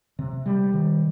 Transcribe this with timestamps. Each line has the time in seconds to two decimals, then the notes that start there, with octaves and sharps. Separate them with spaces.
0.19 C3
0.46 G3
0.73 D#3